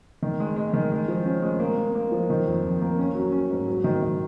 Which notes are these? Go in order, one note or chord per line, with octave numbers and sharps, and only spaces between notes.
D#3
G#3
G#3
D#3
G#3
F3
C#4
G#3
A#3
A#3
A#3
F3
D#3
F2
F2
A#3
C#4
F#3
C#4
G#2
F#3
D#3
D#3